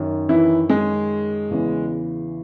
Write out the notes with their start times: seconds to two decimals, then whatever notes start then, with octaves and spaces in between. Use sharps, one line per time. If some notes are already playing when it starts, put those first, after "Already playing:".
Already playing: F#2 D#3
0.29 E3 E4
0.69 G#3 G#4
1.51 E2 C#3 E3